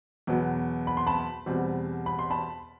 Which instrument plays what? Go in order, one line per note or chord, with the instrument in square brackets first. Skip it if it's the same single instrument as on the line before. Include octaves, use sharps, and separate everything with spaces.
[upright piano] E2 B2 F#3 B3
B5
C6
A5 B5
E2 B2 G3 C4
B5
C6
A5 B5